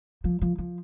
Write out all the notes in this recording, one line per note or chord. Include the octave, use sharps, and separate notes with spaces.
F3
F3
F3